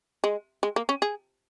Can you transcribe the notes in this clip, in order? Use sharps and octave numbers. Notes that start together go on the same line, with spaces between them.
G#3
G#3
A#3
C#4
G#4